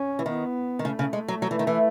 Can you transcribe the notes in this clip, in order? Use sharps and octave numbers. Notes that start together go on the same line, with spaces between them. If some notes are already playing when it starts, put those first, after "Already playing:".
Already playing: C#4
E3
D#3 B3
D#3
C#3 A3
C#3
G#3
F#3
F#3
E3
D#3
E3